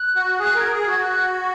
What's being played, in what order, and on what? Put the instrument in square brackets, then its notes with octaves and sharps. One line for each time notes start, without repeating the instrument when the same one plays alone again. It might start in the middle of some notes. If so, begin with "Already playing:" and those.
Already playing: [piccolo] F#6
[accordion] F#4
[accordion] G#4 [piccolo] F#6
[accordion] A#4 [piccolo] G#6
[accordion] G#4
[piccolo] G#6
[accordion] F#4
[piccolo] F#6
C#6